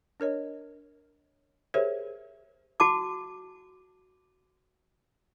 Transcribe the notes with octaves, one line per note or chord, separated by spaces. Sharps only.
D4 A#4 C#5 D#5
G4 G#4 A#4 C5 C#5 E5
F#4 A5 D6